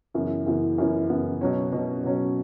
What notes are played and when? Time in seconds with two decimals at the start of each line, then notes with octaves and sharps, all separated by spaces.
0.14 F#2 C#3 E3 B3
0.46 F#2 C#3 E3 B3
0.78 F#2 C#3 E3 B3
1.10 F#2 C#3 E3 B3
1.41 B2 F#3 C#4
1.72 B2 F#3 C#4
2.04 B2 F#3 C#4